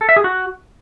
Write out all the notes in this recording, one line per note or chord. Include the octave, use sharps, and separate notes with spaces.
A4
E5
G#4
F#4